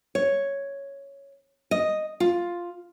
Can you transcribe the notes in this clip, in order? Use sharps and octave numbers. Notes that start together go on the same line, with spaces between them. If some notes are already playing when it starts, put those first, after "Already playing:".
C#5
D#5
F4